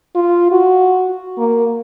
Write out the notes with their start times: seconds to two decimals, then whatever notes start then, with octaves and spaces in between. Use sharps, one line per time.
0.15 F4
0.52 F#4
1.38 A#3